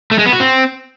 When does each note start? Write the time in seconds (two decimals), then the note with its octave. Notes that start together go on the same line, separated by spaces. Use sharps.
0.11 A3
0.19 G#3
0.26 B3
0.33 F#4
0.40 C4